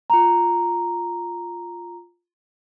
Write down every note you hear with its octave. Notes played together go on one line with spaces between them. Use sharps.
F4 A#5